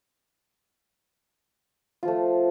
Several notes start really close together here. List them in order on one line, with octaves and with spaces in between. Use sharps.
F4 F3 A3